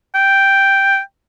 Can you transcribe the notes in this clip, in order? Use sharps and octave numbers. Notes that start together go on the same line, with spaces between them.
G5